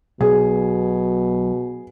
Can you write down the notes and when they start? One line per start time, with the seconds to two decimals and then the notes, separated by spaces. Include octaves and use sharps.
0.21 B1 B2 G#4